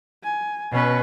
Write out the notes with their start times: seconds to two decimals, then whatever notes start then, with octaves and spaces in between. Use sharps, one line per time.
0.24 G#5
0.72 B2 C#4 B4